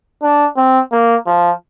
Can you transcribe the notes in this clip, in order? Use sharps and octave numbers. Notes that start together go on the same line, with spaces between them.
D4
C4
A#3
F3